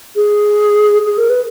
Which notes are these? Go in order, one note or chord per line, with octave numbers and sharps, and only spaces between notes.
G#4
G#4
A#4
B4